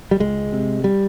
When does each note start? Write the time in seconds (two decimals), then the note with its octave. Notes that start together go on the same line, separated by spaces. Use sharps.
0.11 G3
0.20 C#2 G#3
0.53 C3
0.84 G3